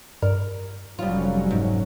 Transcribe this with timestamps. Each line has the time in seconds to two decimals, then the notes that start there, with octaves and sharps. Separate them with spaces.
0.22 G2 A#4 D5
0.99 F1 F#3 G3 C#4 F4
1.51 G#2